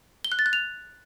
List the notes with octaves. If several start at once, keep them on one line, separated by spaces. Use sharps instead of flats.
G7
F#6
A6
F#6
F7